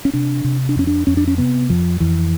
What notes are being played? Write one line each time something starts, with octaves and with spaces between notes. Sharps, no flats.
C#4
C3 D4
C3
D4
F2 C#4
D4
F2 C#4
D4
C#4
C3 B3
F2 F3
F2 E3